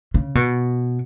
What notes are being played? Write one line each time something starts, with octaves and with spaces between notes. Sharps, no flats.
C#3
B2